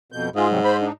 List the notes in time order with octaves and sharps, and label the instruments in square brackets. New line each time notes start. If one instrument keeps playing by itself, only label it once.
[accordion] F2 B2 G6
[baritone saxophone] G#2 [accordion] F4 G#4
[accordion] C3 F#3 G3
C5 B5
D4 D#4